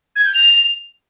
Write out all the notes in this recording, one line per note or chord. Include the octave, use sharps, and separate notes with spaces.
G#6
G6
F7